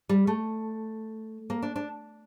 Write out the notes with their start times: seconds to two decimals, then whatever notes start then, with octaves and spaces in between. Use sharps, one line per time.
0.09 G3
0.27 A3
1.50 A#3
1.62 D4
1.76 D4